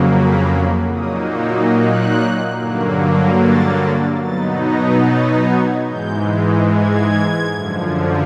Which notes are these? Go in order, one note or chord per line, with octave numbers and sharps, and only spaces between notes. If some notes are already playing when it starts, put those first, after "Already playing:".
Already playing: F2 C#3 F#3 A#3
B5
A#2 F#3 A#3 D#4 D#6
E6
F#6
G2 D3 F#3 A#3
A6
B2 F#3 B3 D#4 A6
A#6
A6
G#6
G#2 E3 G#3 G6
G#6
F#2 D3 F3